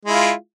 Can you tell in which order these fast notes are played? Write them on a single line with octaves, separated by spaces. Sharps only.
G#3 E4 F4